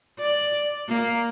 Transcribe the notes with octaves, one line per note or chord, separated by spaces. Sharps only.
D5
A#3